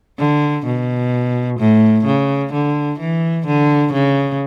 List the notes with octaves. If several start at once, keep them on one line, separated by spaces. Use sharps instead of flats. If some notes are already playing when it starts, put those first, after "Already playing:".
D3
B2
A2
C#3
D3
E3
D3
C#3